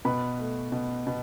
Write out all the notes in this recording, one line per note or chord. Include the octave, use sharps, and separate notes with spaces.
B2 B4 B5
A3
B2
B2